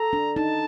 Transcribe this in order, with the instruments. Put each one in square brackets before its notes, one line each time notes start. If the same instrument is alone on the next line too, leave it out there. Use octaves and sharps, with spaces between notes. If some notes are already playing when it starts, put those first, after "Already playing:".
Already playing: [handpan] A4 [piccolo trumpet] A#5
[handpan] D4
[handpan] D#4 [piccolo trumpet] A5